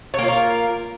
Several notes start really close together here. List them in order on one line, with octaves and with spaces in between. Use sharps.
C#5 A#3 F4 A#4